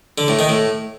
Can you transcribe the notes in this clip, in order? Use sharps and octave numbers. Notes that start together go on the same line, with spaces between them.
D3
A2
D#3
A2